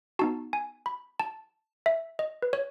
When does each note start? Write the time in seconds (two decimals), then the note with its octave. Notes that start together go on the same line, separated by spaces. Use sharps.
0.19 B3 D#4 F#4 A5
0.53 G#5
0.86 B5
1.20 A5
1.86 E5
2.19 D#5
2.42 B4
2.53 C#5